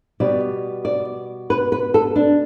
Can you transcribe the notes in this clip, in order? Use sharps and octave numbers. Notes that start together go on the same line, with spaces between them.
B2 G3 B3 D5
D5
B4
B4
A4
D4